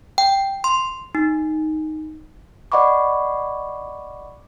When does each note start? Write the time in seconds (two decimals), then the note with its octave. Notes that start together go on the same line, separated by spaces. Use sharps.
0.18 G5
0.64 C6
1.15 D#4
2.72 D5 D#5 F#5 B5 C#6 D6